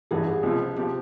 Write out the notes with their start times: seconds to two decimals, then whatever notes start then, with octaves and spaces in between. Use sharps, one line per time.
0.11 A1 G2 E3 G#4
0.43 C#2 C3 F3
0.76 C3 F3 G4